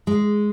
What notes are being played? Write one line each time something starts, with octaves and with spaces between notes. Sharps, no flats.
G#3